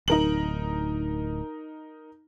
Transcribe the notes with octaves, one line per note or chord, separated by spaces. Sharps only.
D1 D#4 A#4 F#7